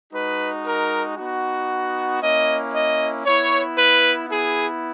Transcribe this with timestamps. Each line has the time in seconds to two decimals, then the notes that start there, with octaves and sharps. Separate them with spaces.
0.13 G#3 D#4 F#4 B4
0.65 A#4
1.17 B3 D#4 F#4
2.22 A#3 C#4 E4 D#5
2.73 D#5
3.25 B3 E4 C#5
3.77 B4
4.29 B3 E4 G#4